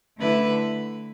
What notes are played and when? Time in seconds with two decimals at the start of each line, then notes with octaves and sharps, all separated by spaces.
0.19 D3 A3 E4 B4 E5